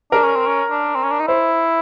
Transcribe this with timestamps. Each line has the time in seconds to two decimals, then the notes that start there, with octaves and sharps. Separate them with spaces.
0.12 D4 A#4
0.24 C#4
0.36 C4
0.47 C#4
0.70 D4
0.95 C4
1.04 C#4
1.12 D4
1.20 D#4
1.27 E4 C5